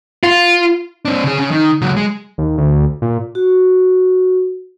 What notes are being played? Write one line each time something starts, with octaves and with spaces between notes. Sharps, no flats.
F4
C4 D4
C#3 G#4
C#3
D#3
C#2 F#3
G#3
D#2
D2
A#2
F#4